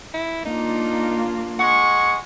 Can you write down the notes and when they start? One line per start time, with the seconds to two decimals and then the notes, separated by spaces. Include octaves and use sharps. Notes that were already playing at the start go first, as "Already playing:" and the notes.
0.14 E4
0.46 A#3 D4 D#4 F4
1.59 G#3 F#5 C#6